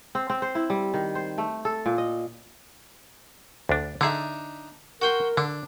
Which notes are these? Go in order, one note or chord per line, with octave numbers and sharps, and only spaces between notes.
C4
C4
C5
E4
G3
D#3
C5
A3
A4
A#2
D#5
D2 D4
D3 D4 D#4 G#4 E5
F#4 A#4 G5 C6
D3 D4